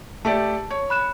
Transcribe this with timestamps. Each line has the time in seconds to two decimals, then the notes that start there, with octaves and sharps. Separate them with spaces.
0.25 A3 G4 D5 A5
0.71 C#5
0.90 B5 F#6 E7